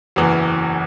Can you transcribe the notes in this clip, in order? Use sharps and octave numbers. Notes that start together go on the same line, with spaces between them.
F#1 E2 E3